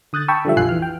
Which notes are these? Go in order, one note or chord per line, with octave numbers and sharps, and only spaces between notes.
D3 D#6 F#6 G6 A6
G5 A5 B5 C#6 E6
D3 F3 G3 E5
A#1 F2 F4 G#5 F#6 C7
E3 F6
G5